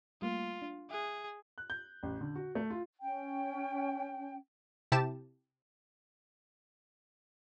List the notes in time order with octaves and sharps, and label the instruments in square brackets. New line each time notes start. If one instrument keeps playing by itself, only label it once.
[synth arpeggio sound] G3 A3 A#3 [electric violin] F4
[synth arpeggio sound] D4
[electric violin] G#4 [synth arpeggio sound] E5 F#6
[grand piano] F#6
G6
A1
D3
F#4
A3
F4
[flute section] C#4 G5
[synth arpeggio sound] C3 E4 G4 A5 E7